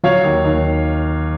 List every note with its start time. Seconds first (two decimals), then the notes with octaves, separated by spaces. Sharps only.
0.04 F#3 C#5 F5
0.24 D#2
0.45 D#2